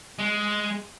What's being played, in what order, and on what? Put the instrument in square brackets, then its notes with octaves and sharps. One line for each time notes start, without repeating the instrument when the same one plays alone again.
[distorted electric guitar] G#3